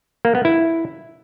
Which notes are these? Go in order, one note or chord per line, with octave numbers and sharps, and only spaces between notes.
A#3
B3
E4